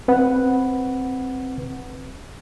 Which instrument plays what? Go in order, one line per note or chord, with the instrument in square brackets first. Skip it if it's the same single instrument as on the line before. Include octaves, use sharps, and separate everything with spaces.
[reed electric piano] C4 B4 F#5